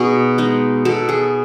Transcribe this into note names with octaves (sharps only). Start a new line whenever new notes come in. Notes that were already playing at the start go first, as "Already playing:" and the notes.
Already playing: B2 B3 D#4 G#4
G#3 D#4
B2 A4
G#4